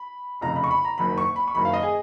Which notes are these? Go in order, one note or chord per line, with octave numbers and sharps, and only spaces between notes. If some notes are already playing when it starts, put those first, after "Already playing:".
Already playing: B5
F1 F2 C#3 A#5
B5
C#6
B5
A#5
F#1 F#2 D#3 B5
C#6
B5
C#6
F#1 F#2 D#3 B5
F5
D#5
G#4